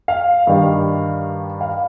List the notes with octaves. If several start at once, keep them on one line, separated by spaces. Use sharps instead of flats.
F5
G2 D#3 G3
F5